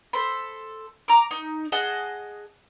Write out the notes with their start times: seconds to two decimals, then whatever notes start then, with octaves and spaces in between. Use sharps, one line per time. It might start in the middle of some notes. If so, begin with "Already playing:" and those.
0.13 A4 C5 B5
1.08 A#5 D6
1.31 D#4
1.72 G#4 D#5 F#5 A5